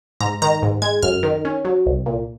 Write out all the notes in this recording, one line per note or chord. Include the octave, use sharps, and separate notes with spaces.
G#2 A#5
D#3 A#5
G#2
G#3 G#6
F#2 F6
D#3
C#4
F#3
C2
A#2